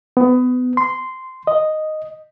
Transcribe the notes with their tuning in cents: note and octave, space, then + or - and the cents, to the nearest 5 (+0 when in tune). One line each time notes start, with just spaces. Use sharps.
B3 +25
C6 -10
D#5 -5